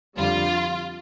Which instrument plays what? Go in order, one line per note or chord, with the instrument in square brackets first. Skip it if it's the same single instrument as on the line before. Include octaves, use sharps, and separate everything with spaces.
[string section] F2 D3 G3 F4